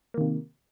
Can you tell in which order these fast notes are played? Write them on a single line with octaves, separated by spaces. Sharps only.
A#3 D#3 C3